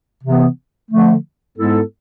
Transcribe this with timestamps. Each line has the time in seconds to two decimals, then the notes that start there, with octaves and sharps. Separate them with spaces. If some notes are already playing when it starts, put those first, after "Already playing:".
0.23 C3 E3 B3
0.90 D3 F3 A3
1.57 G#2 G#3 B3 E4 A4